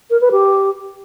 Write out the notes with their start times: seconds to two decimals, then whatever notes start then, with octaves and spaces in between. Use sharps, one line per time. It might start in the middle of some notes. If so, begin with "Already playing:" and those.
0.10 A#4
0.21 B4
0.32 G4